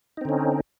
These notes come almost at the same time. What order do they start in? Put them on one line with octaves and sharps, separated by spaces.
D#4 C4 D3 C#4